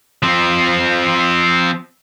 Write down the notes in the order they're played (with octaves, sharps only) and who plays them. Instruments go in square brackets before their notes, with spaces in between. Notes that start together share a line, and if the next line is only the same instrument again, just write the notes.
[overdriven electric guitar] F3 C4